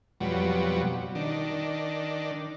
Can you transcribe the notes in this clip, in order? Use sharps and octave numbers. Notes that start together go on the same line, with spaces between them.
F2 B2 F#3 G3
D#3 D4